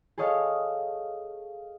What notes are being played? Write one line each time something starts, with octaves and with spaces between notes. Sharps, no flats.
G#4 A4 C#5 D#5 F5